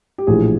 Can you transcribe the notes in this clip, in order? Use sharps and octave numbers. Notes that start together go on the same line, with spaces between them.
G4
A#1 A2 E3 G#4